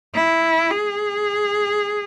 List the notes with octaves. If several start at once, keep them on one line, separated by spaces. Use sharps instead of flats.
E4
G#4